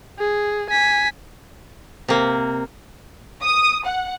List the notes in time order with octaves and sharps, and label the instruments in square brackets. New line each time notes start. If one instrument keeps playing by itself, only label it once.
[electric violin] G#4
G#5 B6
[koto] C3 A#3
[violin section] D#6
F#5